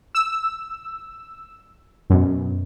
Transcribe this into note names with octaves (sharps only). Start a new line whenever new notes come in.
E6
F#2 B2